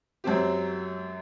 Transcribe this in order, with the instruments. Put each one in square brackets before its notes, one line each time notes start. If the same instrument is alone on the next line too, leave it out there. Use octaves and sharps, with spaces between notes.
[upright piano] F#2 F#3 C4 G4